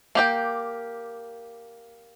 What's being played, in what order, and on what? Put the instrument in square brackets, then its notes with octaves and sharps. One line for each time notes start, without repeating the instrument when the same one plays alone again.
[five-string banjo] A#3 G4 G5